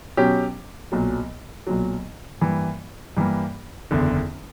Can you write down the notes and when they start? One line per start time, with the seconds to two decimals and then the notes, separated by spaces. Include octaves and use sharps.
0.17 B2 F#3 C#4 G4
0.92 B1 A#2 F#3
1.67 B1 A#2 F#3
2.41 G2 E3 A#3
3.17 G2 E3 A#3
3.91 F#1 E2 D3